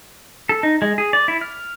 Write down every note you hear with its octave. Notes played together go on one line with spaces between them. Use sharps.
A4
D#4
G#3
G#4
D5
E4
F6